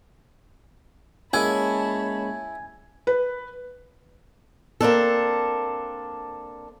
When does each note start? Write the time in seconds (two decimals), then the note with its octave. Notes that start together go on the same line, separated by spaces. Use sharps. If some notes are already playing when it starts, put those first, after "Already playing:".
1.33 G#3 A#3 C#4 E4 C#5 G#5 A5 B5
3.07 B4
4.81 A#3 C4 D4 A4